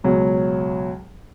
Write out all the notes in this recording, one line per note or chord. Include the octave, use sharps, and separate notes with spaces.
C#2 B2 F#3